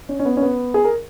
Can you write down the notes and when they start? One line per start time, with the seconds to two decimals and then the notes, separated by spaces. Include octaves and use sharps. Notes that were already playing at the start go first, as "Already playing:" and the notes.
0.09 C#4
0.19 C#4
0.25 B3
0.37 C#4
0.42 B3
0.74 G#4
0.84 A#4